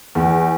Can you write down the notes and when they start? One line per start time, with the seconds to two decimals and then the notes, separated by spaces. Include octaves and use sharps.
0.15 E2